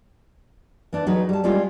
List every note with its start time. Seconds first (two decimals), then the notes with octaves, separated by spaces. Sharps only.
0.93 E3 D4
1.06 F#3 D#4 G#4 B4
1.29 G3 A5
1.44 G3 G#3 C#4 F4 G4